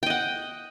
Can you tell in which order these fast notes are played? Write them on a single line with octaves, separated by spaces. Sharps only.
G5 D#5 F#5